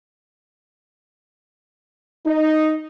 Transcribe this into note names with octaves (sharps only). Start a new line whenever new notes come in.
D#4